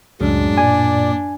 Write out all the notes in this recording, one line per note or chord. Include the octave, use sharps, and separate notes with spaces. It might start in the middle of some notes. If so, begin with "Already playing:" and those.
C#2 F#2 A2 F#3 G#3 D4
A#2 D5 G#5